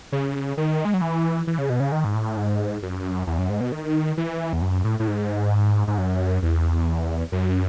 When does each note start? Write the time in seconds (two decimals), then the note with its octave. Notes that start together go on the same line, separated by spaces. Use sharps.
0.12 C#3
0.57 D#3
0.85 G#3
0.94 F#3
1.01 E3
1.47 E3
1.58 C#3
1.70 B2
1.80 C#3
1.92 D#3
2.04 G#2
2.15 A2
2.37 G#2
2.83 F#2
3.27 E2
3.38 F#2
3.50 G#2
3.60 B2
3.72 D#3
4.17 E3
4.53 E2
4.62 F#2
4.84 A2
5.00 A2
5.08 G#2
5.88 G#2
5.98 F#2
6.43 E2
7.32 F#2